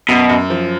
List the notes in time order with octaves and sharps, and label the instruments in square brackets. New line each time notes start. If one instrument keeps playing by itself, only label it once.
[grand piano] F#2 [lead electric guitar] B2
[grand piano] F#2
F3